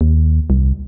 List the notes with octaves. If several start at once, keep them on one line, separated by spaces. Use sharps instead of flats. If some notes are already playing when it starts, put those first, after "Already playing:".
D#2
C2